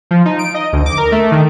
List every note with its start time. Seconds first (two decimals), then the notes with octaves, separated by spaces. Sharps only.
0.11 F3
0.25 D#4
0.39 D7
0.54 D#5
0.73 D2
0.86 D6
0.98 A#4
1.12 A3
1.32 D#3